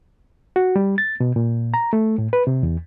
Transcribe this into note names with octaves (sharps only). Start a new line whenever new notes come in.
F#4
G3
A6
B2
A#2
A#5
A3
A2
B4
C3
E2